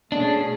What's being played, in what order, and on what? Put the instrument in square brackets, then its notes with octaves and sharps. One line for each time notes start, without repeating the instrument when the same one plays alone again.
[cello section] B2 A3 C#4 G#4 [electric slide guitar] D4